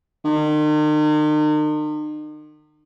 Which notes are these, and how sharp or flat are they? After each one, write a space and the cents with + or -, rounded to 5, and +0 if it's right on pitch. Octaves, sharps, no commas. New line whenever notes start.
D#3 -40